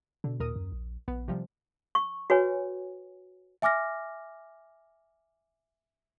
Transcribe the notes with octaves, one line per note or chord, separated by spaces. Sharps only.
B2 D3
D#2 A#2 A#4 D#6
F#2
A#1
A#1 B3
C3 F3 G3
C#6
F#4 B4 C#5 G#5
E5 G#5 D6 F6 A#6